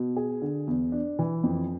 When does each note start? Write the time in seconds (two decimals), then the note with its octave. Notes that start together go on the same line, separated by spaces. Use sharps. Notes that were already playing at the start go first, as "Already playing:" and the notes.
Already playing: B2
0.16 G#4
0.42 D3
0.67 E2
0.92 D4
1.19 E3
1.43 F2